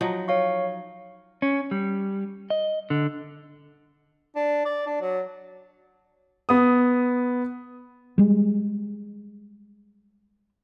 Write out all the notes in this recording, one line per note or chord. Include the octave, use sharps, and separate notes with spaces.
F3 F#3 D#4
C#5 F5 C#6
C#4
G3
D#5
D3
D4
D5
D4
F#3
B3 D#6
G3 G#3